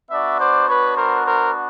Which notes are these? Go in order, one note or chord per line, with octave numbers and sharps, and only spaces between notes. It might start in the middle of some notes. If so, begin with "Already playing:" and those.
B3 D4 F#4 D5 E5
C5 D5
B4 C#5
A#4 C5
A#4 C5